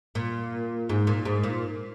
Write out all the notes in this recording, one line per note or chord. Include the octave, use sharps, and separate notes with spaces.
A#2
G#2
A#2
G#2
A#2